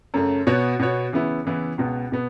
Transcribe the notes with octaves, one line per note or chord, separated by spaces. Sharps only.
F#2 C#3 A3
B2 B3 F#4 C#5
B2 B3 F#4 C#5
C#3 E3 B3 E4
C#3 E3 B3 E4
C#2 B2 B3
B2 B3